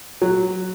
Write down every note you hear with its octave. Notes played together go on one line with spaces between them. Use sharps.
F#3